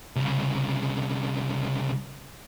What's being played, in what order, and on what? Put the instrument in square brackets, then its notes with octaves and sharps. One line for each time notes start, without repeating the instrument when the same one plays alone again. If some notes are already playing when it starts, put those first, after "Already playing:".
[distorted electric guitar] C2 C#3